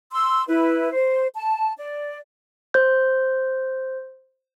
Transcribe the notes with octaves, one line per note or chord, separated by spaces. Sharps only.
C6 E6
E4 B4
C5
A5
D5
C5 G6